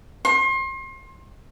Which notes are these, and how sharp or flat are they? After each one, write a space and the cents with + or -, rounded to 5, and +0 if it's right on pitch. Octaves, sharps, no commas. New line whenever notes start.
C6 +35